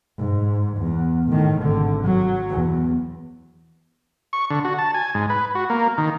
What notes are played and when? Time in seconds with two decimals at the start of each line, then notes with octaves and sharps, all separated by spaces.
0.19 G#2
0.78 E2
1.29 A2 D#3
1.59 G#1 D3
2.03 F#3
2.50 E2
4.33 C#6
4.50 D3
4.65 F#4
4.78 A5
4.94 G#5
5.14 G#2
5.30 B4
5.55 F#4
5.70 A#3
5.98 D#3